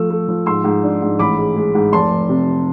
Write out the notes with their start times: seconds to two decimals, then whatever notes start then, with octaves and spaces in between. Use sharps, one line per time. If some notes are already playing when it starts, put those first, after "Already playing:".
Already playing: F3 A3 E6
0.10 A3
0.28 F3
0.46 G#2 C6 E6
0.64 G#2
0.83 D4
1.02 G#2
1.19 A1 B5 D6
1.38 G#3
1.56 G#3
1.75 G#2
1.93 F1 A5 C6
2.11 F1
2.29 C3